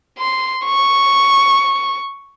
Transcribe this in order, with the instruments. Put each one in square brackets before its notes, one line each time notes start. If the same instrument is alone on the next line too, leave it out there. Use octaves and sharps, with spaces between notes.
[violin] C6
C#6